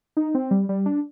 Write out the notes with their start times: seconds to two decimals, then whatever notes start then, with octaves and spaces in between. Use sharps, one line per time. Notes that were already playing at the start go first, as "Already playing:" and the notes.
0.17 D#4
0.35 C4
0.51 G3
0.69 G3
0.86 D4